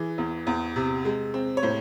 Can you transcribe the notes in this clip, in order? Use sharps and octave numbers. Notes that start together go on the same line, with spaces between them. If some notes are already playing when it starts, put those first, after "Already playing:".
Already playing: E3 G#4
E2
E2
C3
G#3
C4
C#5
A2 C5